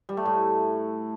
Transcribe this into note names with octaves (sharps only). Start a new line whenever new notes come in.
G3
A3
A2